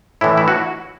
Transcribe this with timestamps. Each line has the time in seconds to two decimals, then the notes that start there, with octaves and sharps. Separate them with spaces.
0.21 A2 E3 E4
0.38 E4
0.48 F#4